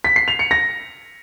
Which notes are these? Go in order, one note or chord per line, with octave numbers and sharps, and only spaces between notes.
B6
C7
F7
C#7
A#6